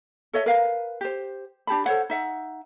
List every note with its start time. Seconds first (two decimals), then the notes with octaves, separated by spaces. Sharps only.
0.33 A4 C#5 D#5 E5
0.46 A#4 B4 F5
1.01 G4 C5
1.67 D4 G4 A5 B5
1.86 A4 C5 C#5 F#5
2.10 D#4 E5 F#5